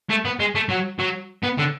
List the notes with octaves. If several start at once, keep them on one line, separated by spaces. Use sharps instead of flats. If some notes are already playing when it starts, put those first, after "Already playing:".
A3
B3
G#3
A3
F#3
F#3
B3
D3